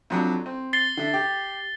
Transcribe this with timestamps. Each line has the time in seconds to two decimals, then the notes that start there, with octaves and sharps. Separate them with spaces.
0.10 F2 F#3 D4
0.46 C4
0.73 A6 C7 G7
0.97 D3 E5
1.14 G4